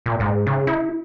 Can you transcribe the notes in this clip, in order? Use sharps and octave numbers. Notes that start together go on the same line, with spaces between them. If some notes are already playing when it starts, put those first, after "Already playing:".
A#2
G#2
C#3
E4